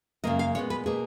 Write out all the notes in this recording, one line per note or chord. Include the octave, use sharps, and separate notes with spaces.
F#2 C#3 F#3 A#3 D#5
F5
A#2 G#3 B3 C#5
B4
B2 A#3 G#4